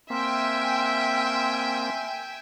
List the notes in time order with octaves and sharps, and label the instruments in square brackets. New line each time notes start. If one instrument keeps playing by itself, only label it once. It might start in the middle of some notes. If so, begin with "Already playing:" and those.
[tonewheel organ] A#3 C4 [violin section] E5 G5 G#5 [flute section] C6 E6 F6